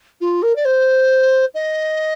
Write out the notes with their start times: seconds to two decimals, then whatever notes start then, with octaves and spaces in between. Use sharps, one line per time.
0.20 F4
0.42 A#4
0.55 D5
0.65 C5
1.54 D#5